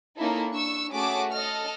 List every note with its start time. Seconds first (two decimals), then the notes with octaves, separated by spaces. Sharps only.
0.18 A#3 C#4 D#4 E4 A4
0.51 D4 C#6 E6
0.91 A3 C#4 F#4 G#4 A5 D6
1.32 A4 D#5 F6